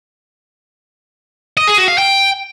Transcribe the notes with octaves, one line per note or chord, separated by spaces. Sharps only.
D#5
G#4
F#4
F5
G5